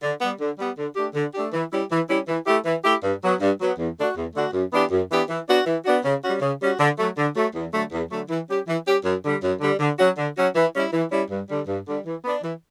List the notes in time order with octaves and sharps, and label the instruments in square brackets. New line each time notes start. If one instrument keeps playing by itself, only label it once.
[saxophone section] D3
G3 B3
D3
G3 B3
D3
A3 D4 G4
D3
A3 D4 G4
E3
G3 C#4 E4 G4
E3
G3 C#4 E4 G4
E3
A3 E4 G4
E3
A3 E4 G4
G2
F#3 B3
G2
F#3 B3
E2
D3 A3 D4 F#4
E2
D3 A3 D4 F#4
F#2
E3 B3 D4 G4
F#2
E3 B3 D4 G4
E3
B3 D4 F#4
E3
B3 D4 F#4
C#3
G3 C#4 F#4
C#3
G3 C#4 F#4
D3
F#3 A3
D3
F#3 A3
E2
D3 F#3 A3
E2
D3 F#3 A3
E3
G3 C#4 G4
E3
G3 C#4 G4
F#2
D3 G3
F#2
D3 G3
D3
F#3 C#4 F#4
D3
F#3 C#4 F#4
E3
G3 C#4 E4
E3
G3 C#4 E4
G2
D3 G3
G2
D3 G3
E3
B3 D4
E3